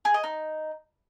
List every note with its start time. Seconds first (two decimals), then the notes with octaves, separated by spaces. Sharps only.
0.05 G#4
0.14 D#5
0.24 D#4